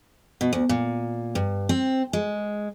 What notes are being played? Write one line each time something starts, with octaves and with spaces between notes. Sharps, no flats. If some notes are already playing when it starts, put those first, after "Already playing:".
B2
D2
A#2
G2
C4
G#3